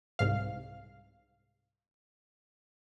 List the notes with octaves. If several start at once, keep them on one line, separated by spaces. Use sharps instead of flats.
C2 G#2 F5